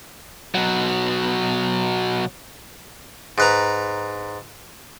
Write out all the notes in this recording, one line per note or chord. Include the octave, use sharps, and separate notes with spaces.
B2 F#3
G#2 B4 A#5